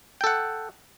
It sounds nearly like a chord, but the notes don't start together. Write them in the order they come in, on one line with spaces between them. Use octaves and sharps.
G5 A4 F#5